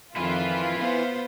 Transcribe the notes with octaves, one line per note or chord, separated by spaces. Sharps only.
F2 D#3 E4 F4 B4 B5
B3 C5